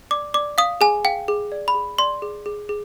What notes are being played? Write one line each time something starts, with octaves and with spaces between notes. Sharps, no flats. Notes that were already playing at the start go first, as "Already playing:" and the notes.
D5 D6
D5 D6
F5 D#6
G#4 G#5
F5 G5
G#4
D5
B5
G#4
D5 C6
G#4
G#4
G#4